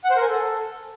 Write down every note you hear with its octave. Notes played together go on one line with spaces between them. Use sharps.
F#5
C5
A#4
G#5
A4